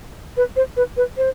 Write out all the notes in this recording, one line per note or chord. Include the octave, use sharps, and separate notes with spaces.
B4
C5
B4
B4
C5